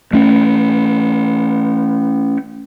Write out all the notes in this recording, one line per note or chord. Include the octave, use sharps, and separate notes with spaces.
A3 C#4